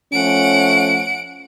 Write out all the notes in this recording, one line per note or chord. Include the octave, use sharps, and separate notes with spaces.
F3 A3 C#4 F#5 D7